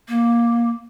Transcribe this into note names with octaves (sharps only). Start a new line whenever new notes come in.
A#3